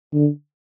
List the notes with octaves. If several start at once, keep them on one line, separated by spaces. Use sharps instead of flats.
D3